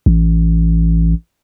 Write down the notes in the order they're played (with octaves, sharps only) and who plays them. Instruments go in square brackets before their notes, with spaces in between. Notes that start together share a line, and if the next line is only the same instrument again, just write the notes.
[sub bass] A1